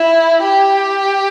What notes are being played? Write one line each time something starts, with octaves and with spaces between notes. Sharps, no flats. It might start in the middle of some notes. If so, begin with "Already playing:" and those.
Already playing: E4
G4